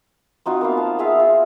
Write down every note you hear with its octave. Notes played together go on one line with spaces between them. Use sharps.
C4 D#4 F4 F#4
A#3 B3 F5
A5
F4 G#4 E5 F5
F4